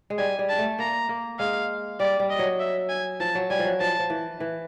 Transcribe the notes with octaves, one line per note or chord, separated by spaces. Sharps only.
G#3
G3 G#5
G3
A5
A3
A#3 A#5
A#3
G#3 F5
G3 D5
G3
D#5
F#3
E5
G#5
F3 A5
F#3
G3 G#5
F3
F#3
F3 A5
F3
E3
E3